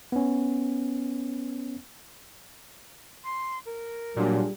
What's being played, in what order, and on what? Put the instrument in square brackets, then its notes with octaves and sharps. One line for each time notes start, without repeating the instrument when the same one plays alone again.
[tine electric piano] B3 C#4
[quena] C6
A#4
[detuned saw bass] A#2 [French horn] F#3 [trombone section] G3 D4 G#4